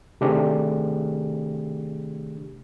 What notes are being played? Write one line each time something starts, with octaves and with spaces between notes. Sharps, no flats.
C3 D#3 A3 D4 G4 G#4